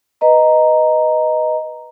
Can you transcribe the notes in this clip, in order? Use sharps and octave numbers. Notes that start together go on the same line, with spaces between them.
B4 D#5 A#5